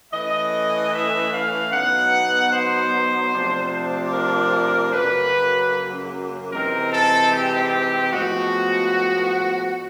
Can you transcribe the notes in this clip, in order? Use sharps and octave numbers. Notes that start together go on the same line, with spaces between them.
E3 A3 C#4 D#5
E5
F5
B2 F#3 B3 D#4 F#5
C5
C3 F3 A3 D4
A#4
F#2 C#3 F#3 A#3 B4
C3 E3 G#3 C4 D#4 A#4
A4
G4
A2 F3 G#3 B3 F#4